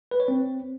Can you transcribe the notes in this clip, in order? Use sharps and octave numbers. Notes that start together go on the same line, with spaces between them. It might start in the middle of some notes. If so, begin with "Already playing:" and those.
B4
C#5
C4